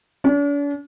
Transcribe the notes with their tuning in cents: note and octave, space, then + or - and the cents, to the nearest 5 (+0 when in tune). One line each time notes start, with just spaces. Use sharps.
D4 -45